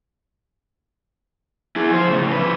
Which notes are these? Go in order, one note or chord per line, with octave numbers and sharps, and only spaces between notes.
E4 G#4
F3 C5
A2 C#3
F3 B4